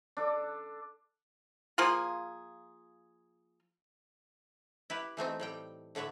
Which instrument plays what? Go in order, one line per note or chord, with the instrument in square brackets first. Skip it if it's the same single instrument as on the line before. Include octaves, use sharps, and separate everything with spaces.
[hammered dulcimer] D4 A4
[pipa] F3 A#3 F4 G#4
[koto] E4 G4 B4
E3 A3 C4 D#4
A2 G3 G5
A2 D3 B4 C#5 E5